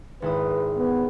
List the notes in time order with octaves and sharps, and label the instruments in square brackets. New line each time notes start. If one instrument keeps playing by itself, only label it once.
[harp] G#1 E4 D#6 [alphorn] B4
[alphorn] B3